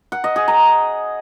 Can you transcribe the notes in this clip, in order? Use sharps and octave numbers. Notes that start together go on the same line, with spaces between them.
F#5
D#5
G#4
A#5